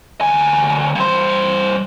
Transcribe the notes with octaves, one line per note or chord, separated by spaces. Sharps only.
D2 G#5
G2 C5